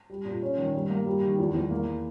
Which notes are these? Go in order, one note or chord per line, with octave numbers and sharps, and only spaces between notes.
G3
A#2
C#4
D#3
G2
A#3
G3
D#3
E2
E2
A#3